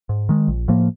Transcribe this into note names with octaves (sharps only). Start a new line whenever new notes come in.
G#2
D#3 G#3
A#1
A2 F3 A#3